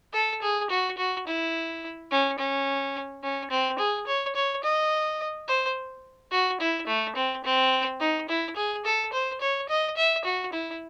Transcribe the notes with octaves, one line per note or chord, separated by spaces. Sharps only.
A4
G#4
F#4
F#4
E4
C#4
C#4
C#4
C4
G#4
C#5
C#5
D#5
C5
F#4
E4
A3
C4
C4
D#4
E4
G#4
A4
C5
C#5
D#5
E5
F#4
E4